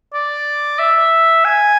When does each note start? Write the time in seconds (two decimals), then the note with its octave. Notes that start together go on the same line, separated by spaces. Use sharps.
0.14 D5
0.79 E5
1.45 G#5